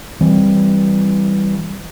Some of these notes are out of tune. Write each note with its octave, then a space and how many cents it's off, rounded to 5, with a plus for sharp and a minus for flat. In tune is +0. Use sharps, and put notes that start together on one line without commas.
E3 +0 G3 +0 C4 +0